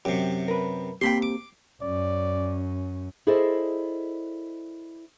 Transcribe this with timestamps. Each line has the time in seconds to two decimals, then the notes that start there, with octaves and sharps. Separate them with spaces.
0.05 F#2 C3 G4
0.48 A#4 B4
1.01 A#3 C4 G4 G5 B5 C6
1.22 D6
1.81 F#2 C#4 D5
3.27 E4 G#4 A4 C5 D5 D#5